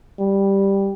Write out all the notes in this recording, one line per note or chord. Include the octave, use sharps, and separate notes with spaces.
G3